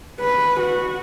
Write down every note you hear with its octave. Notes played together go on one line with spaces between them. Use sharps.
B4
F#4